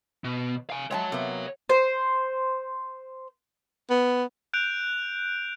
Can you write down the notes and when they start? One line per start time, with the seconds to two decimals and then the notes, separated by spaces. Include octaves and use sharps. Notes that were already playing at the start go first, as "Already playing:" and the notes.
0.24 B2
0.70 F5 G#5
0.91 G#3 C#5 F#5 G5 A5
1.12 C3 A#3 B3
1.69 C5
3.90 B3
4.53 F#6 G6 D7 F7